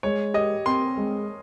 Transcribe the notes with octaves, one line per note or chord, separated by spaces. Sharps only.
G#3 C#5
G4 D#5
C4 C6
G#3